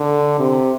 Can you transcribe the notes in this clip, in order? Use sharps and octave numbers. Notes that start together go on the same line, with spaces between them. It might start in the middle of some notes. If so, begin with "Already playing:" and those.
Already playing: D3
C3